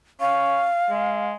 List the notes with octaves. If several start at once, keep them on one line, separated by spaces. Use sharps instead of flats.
C#4 F5
G#3